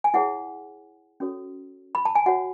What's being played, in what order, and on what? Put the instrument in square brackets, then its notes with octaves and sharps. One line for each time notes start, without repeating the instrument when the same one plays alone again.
[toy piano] G#5
E4 G#4 C#5 F#5
C#4 F#4 A4 C#5
B5
A5
G#5
F#4 C#5 F#5